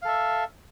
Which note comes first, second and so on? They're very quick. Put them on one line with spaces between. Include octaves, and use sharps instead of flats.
F5 A4 E5